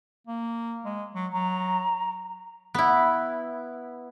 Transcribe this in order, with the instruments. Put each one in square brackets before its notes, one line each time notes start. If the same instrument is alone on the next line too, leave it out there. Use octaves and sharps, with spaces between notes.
[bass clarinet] A#3
G#3
F#3
[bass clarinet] F#3 [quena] A#5
[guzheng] B3 E4